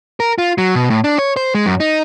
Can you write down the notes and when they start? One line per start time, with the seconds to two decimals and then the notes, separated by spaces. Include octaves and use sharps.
0.20 A#4
0.38 F4
0.58 F#3
0.75 B2
0.90 A2
1.04 D4
1.18 C#5
1.37 C5
1.55 G#3
1.66 F#2
1.80 D#4